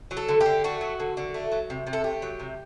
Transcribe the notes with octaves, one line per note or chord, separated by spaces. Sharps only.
F#3
A4
D3
G4
D3
A3 F#4
F#3
D3
D3
A3
F#3
C3
C3
A4
A3 G4
F#3
C3